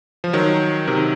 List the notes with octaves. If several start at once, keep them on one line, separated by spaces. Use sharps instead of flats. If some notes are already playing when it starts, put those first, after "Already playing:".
F3
D#3 F#3
C3 D#3